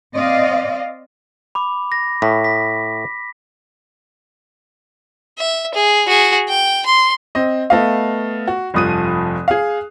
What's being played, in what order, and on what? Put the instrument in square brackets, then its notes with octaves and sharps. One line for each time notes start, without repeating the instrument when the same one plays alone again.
[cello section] C4 D5 D#5 F5
[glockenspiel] B5 D6
A#6
[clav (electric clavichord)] A2 [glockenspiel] B6
[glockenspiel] B6
[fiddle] E5
G#4
F#4 G#4
G5
C6
[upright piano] C4 D#5
A3 B3 D#5 F5
F#4
F1 G2 F3 D#6 F#6 D#7
G#4 F5